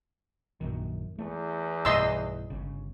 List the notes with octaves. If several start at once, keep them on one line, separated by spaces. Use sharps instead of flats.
A#1 F#2 D#3
E2 A3
B1 G2 A3 D#5 C6 E6
G1 C#3